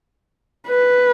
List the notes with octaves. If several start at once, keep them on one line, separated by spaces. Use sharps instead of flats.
B4